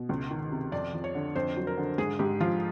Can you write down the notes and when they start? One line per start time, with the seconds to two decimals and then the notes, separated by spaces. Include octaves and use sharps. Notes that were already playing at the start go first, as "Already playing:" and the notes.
Already playing: B2
0.09 C#2
0.31 D#3
0.52 C3
0.72 F2 D5
0.93 F3
1.04 C#5
1.15 D3
1.36 F2 C5
1.57 F#3
1.67 A#4
1.77 D3
1.98 G#2 G#4
2.19 G#2 G4
2.40 F3 F4